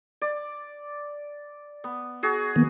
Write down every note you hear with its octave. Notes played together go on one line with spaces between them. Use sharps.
D5
B3
F#4 G#4
D#3 A#3 B3